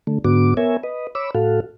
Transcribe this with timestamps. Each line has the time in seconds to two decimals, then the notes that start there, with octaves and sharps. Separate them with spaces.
0.07 D3 A3
0.25 G#2 D3 B3 F#4 D6
0.57 B3 A#4 C#5 E5 G#5
0.83 B4 D#5
1.15 C#5 B5 D6 E6
1.35 A2 F#4 A4 F5